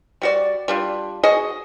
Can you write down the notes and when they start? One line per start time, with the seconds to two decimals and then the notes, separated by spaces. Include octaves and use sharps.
0.22 G3 F#4 D5
0.68 G3 D4 F4
1.23 F#4 G#4 D#5